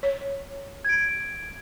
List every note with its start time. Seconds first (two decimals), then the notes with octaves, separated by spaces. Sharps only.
0.03 C#5
0.85 G#6 D7